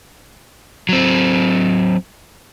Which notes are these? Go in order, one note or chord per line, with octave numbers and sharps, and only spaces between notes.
F#3 C4